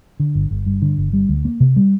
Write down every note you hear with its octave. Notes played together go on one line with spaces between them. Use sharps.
D3
G1
G1
G2
D3
G1
G3
D2
A#3
C3
G3